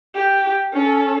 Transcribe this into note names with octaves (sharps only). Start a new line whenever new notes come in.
G4
C#4 A4